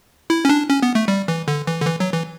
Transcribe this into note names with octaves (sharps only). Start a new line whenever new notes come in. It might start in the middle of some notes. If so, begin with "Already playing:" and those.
E4
C#4
D4
C#4
B3
A3
G3
E3
D3
E3
D3
E3
F#3
E3